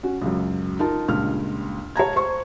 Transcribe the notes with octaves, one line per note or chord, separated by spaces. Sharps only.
C#4 F#4
C#2 F#2
D#4 F4 A#4 A5
C#2 G2 A#2 F6
C#5 A5 A#5 G#6
C5 C#6